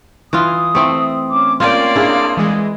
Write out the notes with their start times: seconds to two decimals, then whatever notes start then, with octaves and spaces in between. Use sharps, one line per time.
0.33 E3 E4 F4 D#6
0.75 A3 C4 E4
1.29 C#4 D6
1.60 A#3 C#4 F4 D5 G5 C6
1.96 D4 E4 G#4
2.37 E3 G#3